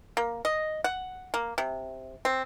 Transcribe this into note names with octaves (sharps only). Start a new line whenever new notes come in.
A#3
D#5
F#5
A#3
C3
C4